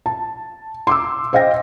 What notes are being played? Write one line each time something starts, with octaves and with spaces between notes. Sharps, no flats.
A5
C6 D6 E6
C5 D#5 F5 G5 A#6